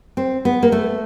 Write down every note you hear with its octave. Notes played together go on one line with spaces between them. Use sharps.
C4
B3
A#3
A3